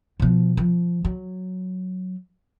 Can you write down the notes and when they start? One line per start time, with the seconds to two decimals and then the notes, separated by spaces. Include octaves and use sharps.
0.20 B2 F3
0.57 F3
1.05 F#3